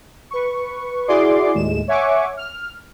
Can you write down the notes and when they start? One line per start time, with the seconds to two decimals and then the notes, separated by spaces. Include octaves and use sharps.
0.31 B4 C#6
1.08 E4 F#4 G#4 D5 C6 D6
1.54 D#2 A2 G#3 E7
1.88 C#5 E5 F#5 G#5 C#6 D6
2.37 F6